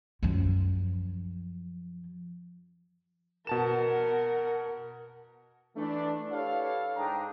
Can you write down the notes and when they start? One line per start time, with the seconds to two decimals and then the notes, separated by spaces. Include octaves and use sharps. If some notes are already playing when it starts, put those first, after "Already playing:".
0.23 F#2 F3
3.47 B2 A#4 F#5 A5 E7
5.76 E3 A3 D4
6.32 E4 G4 A4 B4 C#5 F5
6.96 G#2 D4 G#4 G5 A#5